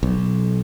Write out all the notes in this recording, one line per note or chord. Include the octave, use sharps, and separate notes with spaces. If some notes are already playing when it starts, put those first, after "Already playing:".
B1